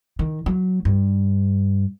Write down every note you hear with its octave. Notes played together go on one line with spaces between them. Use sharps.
D#3
F#3
G2